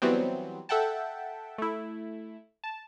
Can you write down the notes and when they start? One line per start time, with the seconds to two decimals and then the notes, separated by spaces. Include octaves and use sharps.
0.02 E3 F#3 G3 B3 C4
0.69 A4 E5 F#5 G5 A5
1.58 A3 E4
2.64 A5